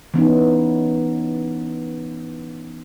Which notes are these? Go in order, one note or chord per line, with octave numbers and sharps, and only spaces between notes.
E3 B3 C#4 D#4